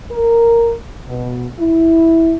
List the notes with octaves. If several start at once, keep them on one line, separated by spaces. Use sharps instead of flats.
A#4
B2
E4